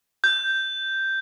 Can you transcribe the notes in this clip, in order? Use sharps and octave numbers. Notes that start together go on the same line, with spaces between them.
G6